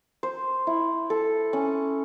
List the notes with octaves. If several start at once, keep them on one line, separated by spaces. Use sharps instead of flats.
C5
E4
A4
C#4